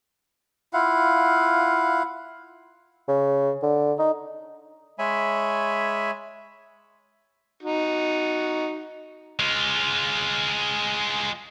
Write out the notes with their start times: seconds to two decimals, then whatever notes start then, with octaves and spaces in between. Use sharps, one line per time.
0.73 E4 F4 F5 F#5
3.08 C#3
3.62 D3
3.99 D#4
4.99 G#3 C#5 E5 G#5 B5
7.63 D#4 F#4
9.39 G#3 F4